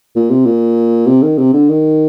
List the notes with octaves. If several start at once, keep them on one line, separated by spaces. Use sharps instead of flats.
A#2
C3
A#2
C3
D#3
C3
D3
D#3